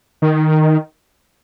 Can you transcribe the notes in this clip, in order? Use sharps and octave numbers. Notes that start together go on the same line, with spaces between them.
D#3